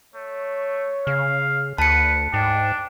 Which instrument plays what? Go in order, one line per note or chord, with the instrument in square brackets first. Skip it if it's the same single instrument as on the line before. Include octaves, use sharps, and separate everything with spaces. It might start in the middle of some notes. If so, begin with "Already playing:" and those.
[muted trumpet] A3 [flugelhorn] C#5
[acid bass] C#3 [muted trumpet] F5
[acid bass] D2 [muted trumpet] B4 [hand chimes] A5 C#7
[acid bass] G#2 [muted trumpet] D4 [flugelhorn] G5